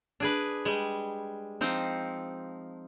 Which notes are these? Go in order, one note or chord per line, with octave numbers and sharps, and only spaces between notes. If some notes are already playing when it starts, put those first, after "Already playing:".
D4 G#4 B4
G3 G#3
F3 C4 D#4